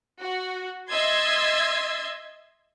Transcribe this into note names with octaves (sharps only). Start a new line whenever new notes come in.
F#4
D#5 E5 C6 E6 G#6 A6